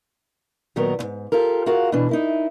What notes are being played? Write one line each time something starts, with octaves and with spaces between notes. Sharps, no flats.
A#2 D#3 F#3 B3 A#4 A#5
D2 G#2
F4 G4 A4 A#4
F4 F#4 G#4 A#4 F5 F#5
B2 E3 D4
D#4 E4 A#4